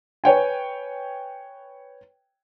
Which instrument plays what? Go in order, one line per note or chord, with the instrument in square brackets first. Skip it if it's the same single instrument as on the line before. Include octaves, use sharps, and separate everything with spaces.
[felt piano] B4 C#5 G5 G#5